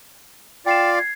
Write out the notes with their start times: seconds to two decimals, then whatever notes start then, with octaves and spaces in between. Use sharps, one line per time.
0.66 F4 D5 G5 C7 E7
0.95 G#6 C7